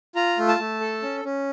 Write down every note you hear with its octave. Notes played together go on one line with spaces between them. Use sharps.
F4 A#5
A3
A5
A3
A4
C#4
C#4